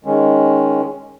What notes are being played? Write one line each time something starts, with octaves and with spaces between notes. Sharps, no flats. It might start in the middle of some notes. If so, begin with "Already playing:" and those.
D#3 G#3 C#4